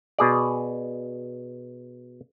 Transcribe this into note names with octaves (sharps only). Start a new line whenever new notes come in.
B2 G#4 D5